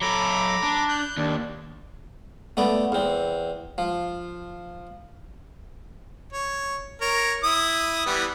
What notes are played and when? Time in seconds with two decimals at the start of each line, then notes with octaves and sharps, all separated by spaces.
0.01 F#3 A4 A#5 B5 D6
0.63 D4
0.88 F#6 G6
1.17 D#2 D4
2.57 A3 B3 D5
2.92 E2 C4
3.78 F3
6.33 C#5
7.01 A#4 C#5
7.44 E4 D#6
8.06 E3 G3 B3